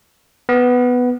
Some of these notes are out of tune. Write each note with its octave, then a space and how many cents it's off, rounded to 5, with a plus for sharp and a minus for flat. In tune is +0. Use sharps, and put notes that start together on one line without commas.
B3 +5